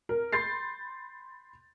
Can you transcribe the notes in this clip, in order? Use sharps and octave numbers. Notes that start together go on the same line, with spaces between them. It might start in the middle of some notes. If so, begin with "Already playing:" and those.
A#4
B5 C6 G6 A6 C7